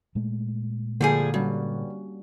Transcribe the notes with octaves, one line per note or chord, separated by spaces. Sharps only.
A#2 G#3 A3
D3 F3 G3 A#3 G#4
G2 G3 C#4 F#4